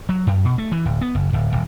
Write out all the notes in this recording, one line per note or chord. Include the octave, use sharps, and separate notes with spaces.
F#3
F#2
B2
A3
E3
D1
B3
F#1
D1
D#1